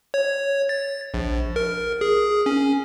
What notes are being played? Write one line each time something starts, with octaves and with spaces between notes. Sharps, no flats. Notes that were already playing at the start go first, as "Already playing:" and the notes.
C#5
A6
A#1
A#4
G#4
C#4